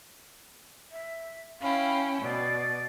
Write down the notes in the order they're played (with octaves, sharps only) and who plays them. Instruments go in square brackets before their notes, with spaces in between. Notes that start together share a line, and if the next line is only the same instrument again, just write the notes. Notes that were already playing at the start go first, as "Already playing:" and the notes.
[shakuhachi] E5
[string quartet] C#4 E4 G5 [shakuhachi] F5
[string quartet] B2 [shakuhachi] D5